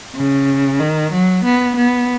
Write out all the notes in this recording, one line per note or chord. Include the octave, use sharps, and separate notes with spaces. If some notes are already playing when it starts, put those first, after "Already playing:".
C#3
D#3
F#3
B3
B3